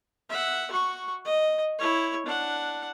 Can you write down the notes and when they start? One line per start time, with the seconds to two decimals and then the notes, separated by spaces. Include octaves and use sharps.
0.29 E5 F#5
0.71 F#4 C#6
1.25 D#5
1.79 E4 C#5
2.26 D4 F#5